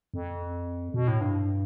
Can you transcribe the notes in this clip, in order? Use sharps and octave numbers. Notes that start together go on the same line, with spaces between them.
F2
B2
A2
G2